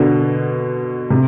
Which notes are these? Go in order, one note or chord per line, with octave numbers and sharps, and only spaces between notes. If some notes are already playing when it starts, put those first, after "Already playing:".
Already playing: B2 D3
C3